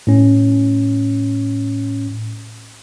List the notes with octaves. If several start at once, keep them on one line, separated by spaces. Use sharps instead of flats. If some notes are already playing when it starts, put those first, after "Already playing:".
A2 C#4